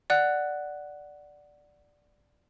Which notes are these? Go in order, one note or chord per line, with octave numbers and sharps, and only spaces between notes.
D5 F#5 F#6